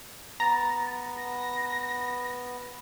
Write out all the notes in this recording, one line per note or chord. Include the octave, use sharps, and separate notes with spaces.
B3 A#5 A6
A#6